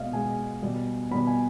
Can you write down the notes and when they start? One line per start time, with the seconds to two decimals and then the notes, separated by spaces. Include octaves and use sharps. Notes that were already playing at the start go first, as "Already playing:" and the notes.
Already playing: B2 G#3 B3 D5 D#5 F5
0.13 B2 G#3 B3 G#5
0.62 B2 G3 B3
1.11 B2 G3 B3 B5
1.27 G#5